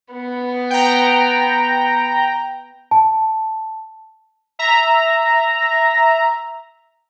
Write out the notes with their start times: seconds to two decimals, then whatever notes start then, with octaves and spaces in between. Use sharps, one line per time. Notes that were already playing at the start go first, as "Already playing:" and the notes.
0.12 B3
0.70 G5 A#5
2.91 A5
4.59 E5 A#5